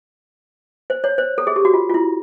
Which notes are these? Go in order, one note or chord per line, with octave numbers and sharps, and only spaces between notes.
C5
C#5
C5
A4
G#4
G4
F#4
F4
F4
E4